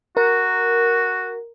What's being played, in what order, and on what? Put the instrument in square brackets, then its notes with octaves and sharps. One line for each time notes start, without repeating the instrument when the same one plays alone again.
[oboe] F#4 [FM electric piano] A#4